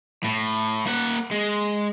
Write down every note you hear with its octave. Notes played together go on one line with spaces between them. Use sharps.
A2
A#3 F#5
G#3